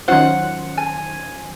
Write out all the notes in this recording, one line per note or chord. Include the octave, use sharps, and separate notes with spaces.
D#3 F#3 C#4 F4 C5 F#5
G#5